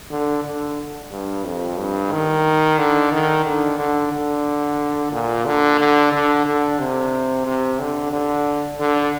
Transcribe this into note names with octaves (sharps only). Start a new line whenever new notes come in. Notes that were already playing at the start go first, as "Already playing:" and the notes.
D3
D3
G2
F2
G2
D#3
D3
D#3
D3
D3
D3
A#2
D3
D3
D3
D3
C3
C3
D3
D3
D3